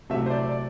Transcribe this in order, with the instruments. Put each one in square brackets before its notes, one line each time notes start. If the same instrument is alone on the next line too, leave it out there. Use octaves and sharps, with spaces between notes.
[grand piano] C3 F#3 A3 E5
C5
D5
D5